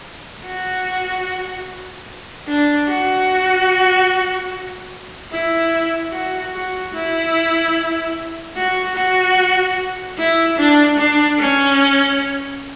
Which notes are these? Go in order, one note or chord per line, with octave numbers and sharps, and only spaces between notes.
F#4
D4
F#4
E4
F#4
F#4
E4
F#4
F#4
E4
D4
D4
C#4